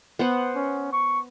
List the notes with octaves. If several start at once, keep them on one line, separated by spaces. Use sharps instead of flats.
B3 C5 F#5
C#4
C#6